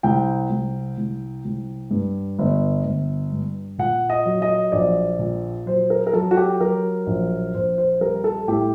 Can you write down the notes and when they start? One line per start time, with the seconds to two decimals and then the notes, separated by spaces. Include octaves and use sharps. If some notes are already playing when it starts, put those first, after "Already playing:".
0.03 C2 G5
0.50 C2
0.98 C2
1.45 C2
1.91 G2
2.39 G1
2.84 G1
3.32 G2
3.78 A#2 F#5
4.10 D#5
4.25 F#3
4.42 D#5
4.72 A#1 D5
5.19 A#2
5.66 F#3 C5
5.90 A#4
6.07 A#4
6.13 F#3 A4
6.31 F#4
6.37 G4
6.60 F#3 A#4
7.07 A#1
7.54 A#1 C5
7.78 C5
8.01 G3 A#4
8.24 A4
8.48 A2 G4